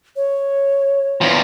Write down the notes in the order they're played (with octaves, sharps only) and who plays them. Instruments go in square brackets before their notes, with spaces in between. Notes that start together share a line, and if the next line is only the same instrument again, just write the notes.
[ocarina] C#5
[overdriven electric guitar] E2 F3